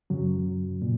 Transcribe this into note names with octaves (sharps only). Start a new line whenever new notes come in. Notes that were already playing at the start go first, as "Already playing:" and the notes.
F#2 C#3 F#3
A#2